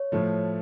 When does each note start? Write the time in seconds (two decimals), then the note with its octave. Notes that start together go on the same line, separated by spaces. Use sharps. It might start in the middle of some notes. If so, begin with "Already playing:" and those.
Already playing: C#5
0.12 A2 F3 A3